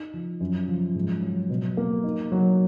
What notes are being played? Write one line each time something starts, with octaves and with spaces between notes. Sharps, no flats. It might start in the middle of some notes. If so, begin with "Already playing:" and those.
Already playing: D#4
F3
F#2
F3
G#2
F#3
B2
A#3
D#4
F#3